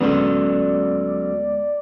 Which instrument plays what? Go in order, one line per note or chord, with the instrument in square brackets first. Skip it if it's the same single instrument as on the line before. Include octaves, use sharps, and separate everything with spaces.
[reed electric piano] D2 G#3 B3 [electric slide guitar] F#3 C#4 A4 [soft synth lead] D5